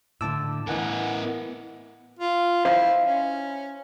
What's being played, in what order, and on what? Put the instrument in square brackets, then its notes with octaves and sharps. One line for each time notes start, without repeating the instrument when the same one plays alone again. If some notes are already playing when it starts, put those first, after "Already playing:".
[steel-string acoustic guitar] A2 D3 [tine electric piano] A5 D6 E6
[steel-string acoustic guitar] A2 E3 [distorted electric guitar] B3 A#4 [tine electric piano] D#5 F#5 G#5
[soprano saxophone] F4
[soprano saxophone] E4 [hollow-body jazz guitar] C5 D#5 F5
[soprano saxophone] C#4